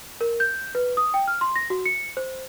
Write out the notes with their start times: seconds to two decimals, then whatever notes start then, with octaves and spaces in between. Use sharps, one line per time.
0.21 A#4
0.40 G6
0.75 B4
0.97 D#6
1.14 G5
1.28 F6
1.41 C6
1.56 A#6
1.70 F#4
1.86 C#7
2.17 C5